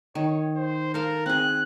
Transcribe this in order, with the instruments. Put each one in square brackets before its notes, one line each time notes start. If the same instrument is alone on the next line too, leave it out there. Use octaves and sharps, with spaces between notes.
[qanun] D#3 [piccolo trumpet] C#5
[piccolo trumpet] C5
[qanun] A4 F5 A5 [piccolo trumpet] A#4
[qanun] C4 G#4 [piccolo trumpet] F#6